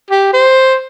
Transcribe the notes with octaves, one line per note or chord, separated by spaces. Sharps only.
G4
C5